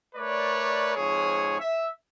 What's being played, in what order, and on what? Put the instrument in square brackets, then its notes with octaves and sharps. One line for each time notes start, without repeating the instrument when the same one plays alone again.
[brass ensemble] A3 A#4 B4 C#5 D5
F2 G#2 G#4 C#5
E5